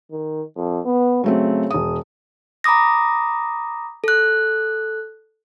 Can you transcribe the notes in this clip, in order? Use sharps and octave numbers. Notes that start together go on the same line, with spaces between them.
D#3
F2
B3
C#3 F#3 A3 C4
E1 D#6
A#5 B5 D6 D#6 A#6
A4 F#6